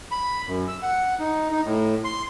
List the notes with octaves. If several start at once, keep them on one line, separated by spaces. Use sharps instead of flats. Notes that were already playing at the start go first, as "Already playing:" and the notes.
B5
F#2
E6
F#5
D#4
D#4
A2
C6